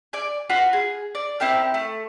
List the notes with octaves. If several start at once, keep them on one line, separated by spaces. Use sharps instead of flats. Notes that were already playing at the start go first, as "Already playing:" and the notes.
D5 G#5
F4 F#4 B4 B5
G#4
D5
C4 E4 G4 A#4
A3